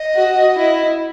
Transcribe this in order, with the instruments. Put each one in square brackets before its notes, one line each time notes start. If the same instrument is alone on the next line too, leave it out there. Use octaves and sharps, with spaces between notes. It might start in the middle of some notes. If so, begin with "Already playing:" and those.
Already playing: [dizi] D#5
[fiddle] F#4
E4